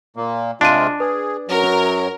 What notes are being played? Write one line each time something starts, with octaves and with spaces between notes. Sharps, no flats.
A#2 A#3
C3 G#3 D4 F4 A5 D#7
G#4 B4
F#2 F#3 A#4